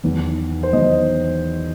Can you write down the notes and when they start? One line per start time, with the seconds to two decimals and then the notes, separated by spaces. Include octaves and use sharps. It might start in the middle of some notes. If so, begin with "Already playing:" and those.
0.03 E2 D#3 F#3
0.63 C5
0.73 E2 D#3 F#3 D#5